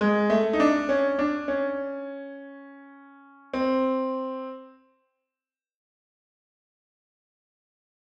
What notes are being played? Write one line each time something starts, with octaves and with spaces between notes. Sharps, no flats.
G#3
A3
D#4
D4
C#4
D4
C#4
C4